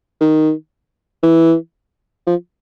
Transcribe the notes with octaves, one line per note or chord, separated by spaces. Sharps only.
D#3
E3
F3